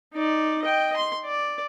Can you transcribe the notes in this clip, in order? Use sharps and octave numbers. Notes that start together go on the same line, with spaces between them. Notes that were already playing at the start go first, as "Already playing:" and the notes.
D#4 D5
D#5 G5
C6
D5